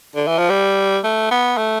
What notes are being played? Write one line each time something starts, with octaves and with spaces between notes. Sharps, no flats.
D3
E3
F3
G3
A3
B3
A3